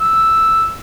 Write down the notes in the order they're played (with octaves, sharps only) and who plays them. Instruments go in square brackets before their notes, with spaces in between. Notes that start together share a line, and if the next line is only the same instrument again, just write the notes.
[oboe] E6